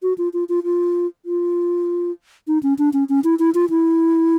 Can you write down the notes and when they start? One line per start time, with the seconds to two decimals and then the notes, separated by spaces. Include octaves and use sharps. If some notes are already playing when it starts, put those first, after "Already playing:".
0.02 F#4
0.18 F4
0.33 F4
0.49 F4
0.64 F4
1.25 F4
2.47 D#4
2.63 C#4
2.78 D4
2.93 C#4
3.09 C#4
3.24 E4
3.39 E4
3.54 F4
3.70 E4